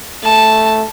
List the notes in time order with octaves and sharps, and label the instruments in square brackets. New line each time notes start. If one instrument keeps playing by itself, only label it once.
[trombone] A3 [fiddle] A5